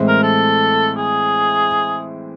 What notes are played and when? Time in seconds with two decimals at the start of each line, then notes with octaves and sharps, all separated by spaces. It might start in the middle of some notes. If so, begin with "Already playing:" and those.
Already playing: A2 E3 G#3 C4 E4
0.08 A#4
0.23 A4
0.97 G#4